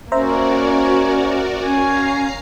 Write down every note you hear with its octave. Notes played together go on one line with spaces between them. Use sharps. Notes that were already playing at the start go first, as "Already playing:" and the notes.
A#3 C#4 F#4 A#4 C5 D5 E5 A#5
C#4 F5 G#5 A#5 C7